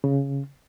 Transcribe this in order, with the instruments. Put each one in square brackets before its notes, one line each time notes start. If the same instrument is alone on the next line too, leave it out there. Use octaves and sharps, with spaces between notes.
[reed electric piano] C#3